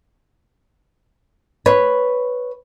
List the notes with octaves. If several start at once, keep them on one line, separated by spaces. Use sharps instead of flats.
B4 C#5